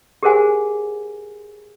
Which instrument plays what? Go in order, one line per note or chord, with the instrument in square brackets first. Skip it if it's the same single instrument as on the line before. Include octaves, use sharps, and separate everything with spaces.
[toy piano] G4 G#4 A#4 C5 F#5 G#5